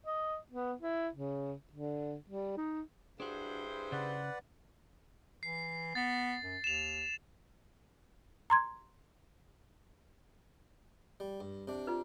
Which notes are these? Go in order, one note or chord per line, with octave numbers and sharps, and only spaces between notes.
D#5
B3
E4
C#3
D3
G3
D#4
G2 D4 E4 F#4 G#4 C5
C#3 B4 D5 F#5
E3 C7
B3 A6
F#2
D#2 E7 F7
A#5 C6 G#6
G3
G2
C3 D4
F4 B4